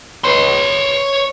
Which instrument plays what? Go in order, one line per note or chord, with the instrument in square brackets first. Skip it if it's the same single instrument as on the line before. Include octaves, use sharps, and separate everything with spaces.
[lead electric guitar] C#5 C6